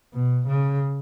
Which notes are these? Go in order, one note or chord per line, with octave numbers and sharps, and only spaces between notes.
B2
C#3